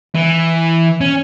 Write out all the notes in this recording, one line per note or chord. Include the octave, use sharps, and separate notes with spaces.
E3
C#4